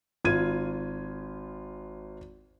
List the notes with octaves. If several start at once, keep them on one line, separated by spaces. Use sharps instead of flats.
G#1 F4 G#6 D#7